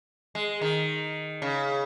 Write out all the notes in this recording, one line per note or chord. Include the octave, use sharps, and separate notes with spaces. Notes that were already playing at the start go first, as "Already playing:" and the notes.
G#3
D#3
C#3